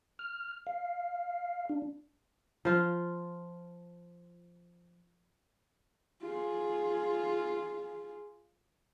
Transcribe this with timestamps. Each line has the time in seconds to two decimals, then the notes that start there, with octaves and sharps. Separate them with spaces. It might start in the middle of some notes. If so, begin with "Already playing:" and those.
0.19 F6
0.67 F5
1.69 D4
2.65 F3 F4
6.21 F4 G#4